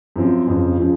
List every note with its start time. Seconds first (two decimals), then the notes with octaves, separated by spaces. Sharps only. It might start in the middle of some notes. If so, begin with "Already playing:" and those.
0.16 F#2 F3 C4
0.47 F2 C#3 F3
0.78 C#3 F3